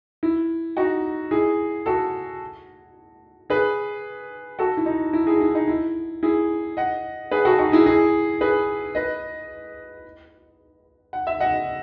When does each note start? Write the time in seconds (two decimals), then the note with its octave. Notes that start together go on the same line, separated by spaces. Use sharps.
0.23 E4
0.77 D#4 F#4
1.31 E4 G#4
1.86 F#4 A4
3.50 G#4 B4
4.59 F#4 A4
4.77 E4
4.86 D#4
5.13 E4
5.27 E4 G#4
5.41 E4
5.55 D#4
5.68 E4
6.23 E4 G#4
6.77 D#5 F#5
7.32 G#4 B4
7.45 F#4 A4
7.59 D#4 F#4
7.72 E4 G#4
7.86 E4 G#4
8.41 G#4 B4
8.95 B4 D#5
11.13 F#5
11.27 E5
11.40 D#5 F#5